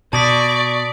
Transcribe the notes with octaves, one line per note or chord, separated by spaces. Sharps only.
B2 D5 A5 C#6 D#6 B6